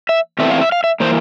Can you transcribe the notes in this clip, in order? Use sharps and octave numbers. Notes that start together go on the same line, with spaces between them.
E5
E2 E3 A3 C4 E5
F5
E5
F5
E5
E3 A#3 C5